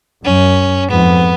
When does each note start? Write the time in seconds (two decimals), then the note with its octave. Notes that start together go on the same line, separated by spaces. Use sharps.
0.25 F#2 C#4
0.90 F2 G#2 B3